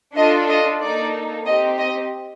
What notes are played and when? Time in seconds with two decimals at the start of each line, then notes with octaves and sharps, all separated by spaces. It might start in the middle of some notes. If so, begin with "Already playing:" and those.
0.16 D4 F4 A4 D#5
0.49 D#5
0.81 A#3 D#4 A4 D5
1.46 C4 D#4 G4 D#5
1.79 D#5